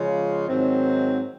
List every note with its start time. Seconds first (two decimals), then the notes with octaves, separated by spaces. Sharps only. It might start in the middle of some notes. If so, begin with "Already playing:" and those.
Already playing: C#3 F3 G#3 C#4 F4
0.48 G#2 D#3 F#3 C4